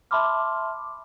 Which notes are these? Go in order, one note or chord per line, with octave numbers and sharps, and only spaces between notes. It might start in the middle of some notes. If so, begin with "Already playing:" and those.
E5 A5 B5 C6 D6 F6